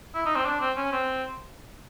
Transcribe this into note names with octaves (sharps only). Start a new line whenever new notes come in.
E4
D#4
C4
D4
C4
C#4
C4